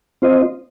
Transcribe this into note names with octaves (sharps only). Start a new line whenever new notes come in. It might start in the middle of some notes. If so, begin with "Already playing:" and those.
C4 F4 C5 D#5